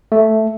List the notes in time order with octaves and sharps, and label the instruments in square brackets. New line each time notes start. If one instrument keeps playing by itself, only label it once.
[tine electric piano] A3